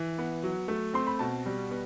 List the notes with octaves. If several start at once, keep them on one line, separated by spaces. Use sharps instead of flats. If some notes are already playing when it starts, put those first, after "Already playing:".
Already playing: E3
B3
F#3
A3
C4 C6
B5
B2 A5
G3
B3